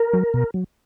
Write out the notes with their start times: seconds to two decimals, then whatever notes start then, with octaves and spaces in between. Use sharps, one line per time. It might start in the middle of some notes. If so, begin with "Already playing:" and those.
Already playing: A#4
0.13 F#3
0.34 B2
0.54 F#3